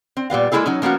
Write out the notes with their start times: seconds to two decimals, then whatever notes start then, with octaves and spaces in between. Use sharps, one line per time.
0.17 C4
0.30 A#2 G3 B3 F5
0.52 G#3 A#3 D#4 E4 G#4 A4
0.66 F#3 C#4 D#4
0.82 F3 A#3 B3 C#4 F#4